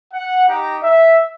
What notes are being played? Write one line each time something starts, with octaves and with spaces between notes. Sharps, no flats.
F#5
D#4 G4 A#5
E5